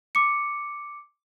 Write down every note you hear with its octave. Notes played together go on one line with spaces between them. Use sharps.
D6 C#7